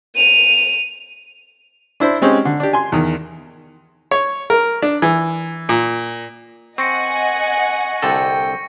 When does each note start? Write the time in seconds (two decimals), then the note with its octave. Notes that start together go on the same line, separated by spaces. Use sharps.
0.15 D#7 F7
2.00 D4 E4 C5
2.22 G#3 C4 C#4 D#4 G4
2.45 D3
2.60 D4 G4
2.73 G#5 C6
2.92 E2 D#3
4.11 C#5
4.50 A#4
4.82 D4
5.02 E3
5.69 A#2
6.78 C4 D#5 F#5 G#5 C#6 A#6 C#7
8.03 C2 D3 A4 G5